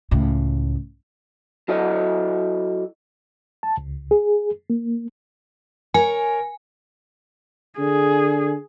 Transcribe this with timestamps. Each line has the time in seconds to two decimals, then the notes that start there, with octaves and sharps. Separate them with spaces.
0.11 C#2 A2
1.68 F#3 E4 A4 D#5
3.63 A5
3.78 C#2
4.11 G#4
4.70 A#3
5.94 A#4 C#5 G#5
7.79 D3 G#4